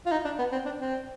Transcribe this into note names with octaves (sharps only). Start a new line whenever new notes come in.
F4
D#4
D4
B3
C4
D4
C4